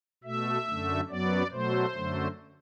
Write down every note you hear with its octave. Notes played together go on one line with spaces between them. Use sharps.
B2 A3 E5
F#2 D3 A3
F#2 F#3 B3 D5
B2 F#3 A3 C5
F#2 D3 F#3 A3